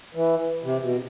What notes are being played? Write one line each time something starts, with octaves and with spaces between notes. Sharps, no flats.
E3
C3
B2